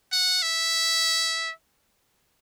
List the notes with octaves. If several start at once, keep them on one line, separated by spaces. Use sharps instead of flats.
F#5
E5